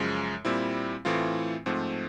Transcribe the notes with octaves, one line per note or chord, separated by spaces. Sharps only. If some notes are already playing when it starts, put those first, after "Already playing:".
Already playing: F#2 C#3 F3 G#3
A#2 G3 C4 E4
A2 E3 A3 C4 F4
G#2 F3 A3 C4